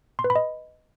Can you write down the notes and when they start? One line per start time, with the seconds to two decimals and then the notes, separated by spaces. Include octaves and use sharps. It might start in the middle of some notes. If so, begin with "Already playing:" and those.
0.19 C6
0.24 B4
0.30 B5
0.36 D#5